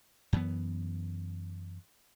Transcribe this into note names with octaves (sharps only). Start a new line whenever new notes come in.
F#2 E3 B3